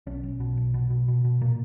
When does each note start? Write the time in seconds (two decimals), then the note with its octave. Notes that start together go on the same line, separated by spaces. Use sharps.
0.07 B1 C#4
0.23 B1
0.40 B2
0.57 B1
0.74 B2
0.90 B2
1.08 B2
1.24 B2
1.41 A#2 A#3